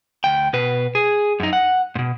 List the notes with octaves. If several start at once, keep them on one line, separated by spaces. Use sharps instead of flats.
D2 G5
B2 B4
G#4
F#2 D#4
F#5
G#2 B2